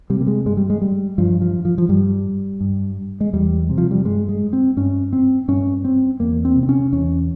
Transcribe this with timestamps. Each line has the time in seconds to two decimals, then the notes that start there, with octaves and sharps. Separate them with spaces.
0.10 C3 G3
0.20 A#3
0.27 G#3
0.46 G2 G#3
0.57 G3
0.70 G#3
0.82 G3
1.18 G2 F3
1.42 F3
1.65 F3
1.78 F3
1.89 G2 G3
2.61 G2
3.21 G#3
3.33 E2 G3
3.70 C3
3.78 F3
3.91 G3
4.05 G2 G#3
4.29 G#3
4.53 C4
4.77 G2 C#4
5.13 C4
5.48 G2 C#4
5.84 C4
6.20 E2 A#3
6.45 C4
6.56 C3
6.63 C4
6.69 C#4
6.93 E2 C#4